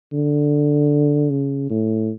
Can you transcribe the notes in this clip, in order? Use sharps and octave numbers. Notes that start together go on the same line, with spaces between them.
D3
C#3
A2